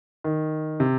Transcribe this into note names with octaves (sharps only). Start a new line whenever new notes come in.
D#3
C3